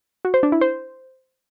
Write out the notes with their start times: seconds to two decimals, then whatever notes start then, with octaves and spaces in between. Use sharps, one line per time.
0.25 F#4
0.34 C5
0.43 D4
0.52 E4
0.61 C5